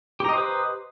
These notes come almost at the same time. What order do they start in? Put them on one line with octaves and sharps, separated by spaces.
G4 A#5 D#5 C5 B4